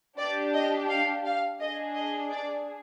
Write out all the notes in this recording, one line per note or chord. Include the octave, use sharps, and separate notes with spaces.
D4 G4 D5
D#5
F5
F5
D4 G#4 D#5
D#5
D5